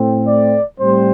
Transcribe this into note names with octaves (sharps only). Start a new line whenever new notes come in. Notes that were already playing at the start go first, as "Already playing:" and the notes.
Already playing: A2 A3 C4
D5
A2 G3 C4 C5